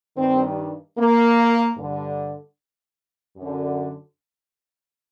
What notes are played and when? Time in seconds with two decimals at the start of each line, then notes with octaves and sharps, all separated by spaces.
0.17 G2 D#3 C4
0.98 A#3
1.77 G2 D3
3.37 F#2 D3